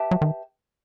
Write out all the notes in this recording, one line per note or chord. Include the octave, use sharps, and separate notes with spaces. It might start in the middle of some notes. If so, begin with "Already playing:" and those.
Already playing: G4 B4 E5 A5
F#3
D#3